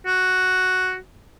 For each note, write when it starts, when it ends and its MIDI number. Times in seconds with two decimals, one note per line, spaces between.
0.06 0.97 66